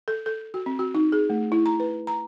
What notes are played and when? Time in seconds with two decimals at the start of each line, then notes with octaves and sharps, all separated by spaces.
0.08 A4
0.26 A4
0.54 F#4
0.66 C4
0.79 F#4
0.95 D#4
1.12 G#4
1.30 A3
1.52 E4
1.66 A#5
1.80 B4
2.07 A#5